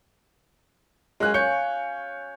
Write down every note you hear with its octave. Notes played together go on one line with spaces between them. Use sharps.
F#2 G#3 F5 G#5 F#6
C#5 F5 C#6 G6 C#7